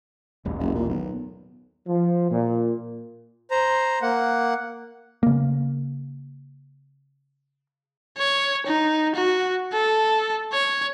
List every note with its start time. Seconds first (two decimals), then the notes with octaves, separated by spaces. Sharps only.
0.45 D#1 A1 D#2
0.59 F#1
0.75 A#2
0.89 B1
1.87 F3
2.30 A#2
3.51 C5 A#5
4.02 A#3 F#5
5.23 C#3 A#3
8.18 C#5
8.66 D#4
9.15 F#4
9.72 A4
10.53 C#5